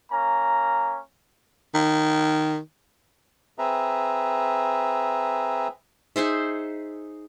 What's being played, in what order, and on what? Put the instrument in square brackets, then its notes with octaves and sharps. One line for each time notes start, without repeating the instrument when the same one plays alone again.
[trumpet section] A#3 C#4 A#5
[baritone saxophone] D#3
[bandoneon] C4 G#4 B4 E5 A#5
[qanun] D#4 G#4 C5 E5